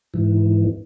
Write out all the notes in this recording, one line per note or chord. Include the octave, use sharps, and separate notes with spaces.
G#2 E3